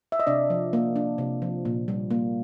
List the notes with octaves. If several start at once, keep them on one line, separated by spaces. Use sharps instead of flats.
E5
D#5
C3 D4 D5
F3
A#3
D4
C3
F3
A#2
G3
A#3